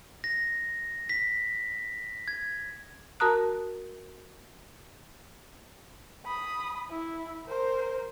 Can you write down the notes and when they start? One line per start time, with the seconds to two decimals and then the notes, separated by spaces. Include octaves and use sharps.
0.24 A#6
1.09 B6
2.28 G#6
3.20 F#4 A#4 A5 A#5 D#6 F#6
6.25 B5 D#6
6.90 E4
7.47 A#4 C5